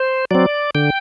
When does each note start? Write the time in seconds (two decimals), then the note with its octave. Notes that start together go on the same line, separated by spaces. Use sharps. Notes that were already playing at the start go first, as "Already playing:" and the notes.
Already playing: C5
0.31 F#3 C4 D5
0.75 D3 G5